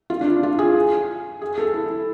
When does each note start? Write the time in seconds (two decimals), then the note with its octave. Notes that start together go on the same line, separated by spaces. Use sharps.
0.10 F4
0.21 D4
0.43 F4
0.59 G#4
1.42 G#4
1.58 A4
1.74 E4